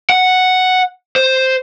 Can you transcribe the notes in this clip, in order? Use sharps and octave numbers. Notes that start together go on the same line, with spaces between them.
F#5
C5